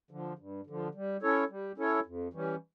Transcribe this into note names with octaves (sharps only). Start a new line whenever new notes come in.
D3 F3
G2
D3 F3
G3
C#4 E4 A4 C#5
G3
C#4 E4 A4 C#5
F2
E3 G3 C#4